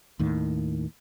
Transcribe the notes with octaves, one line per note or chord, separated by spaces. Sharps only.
D#2 A2 D#3